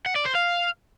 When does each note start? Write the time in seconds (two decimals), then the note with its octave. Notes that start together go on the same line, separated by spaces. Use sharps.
0.06 F#5
0.16 D5
0.25 C5
0.35 F5